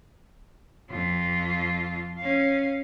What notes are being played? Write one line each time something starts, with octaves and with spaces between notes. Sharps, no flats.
F2 F4
C#4 F5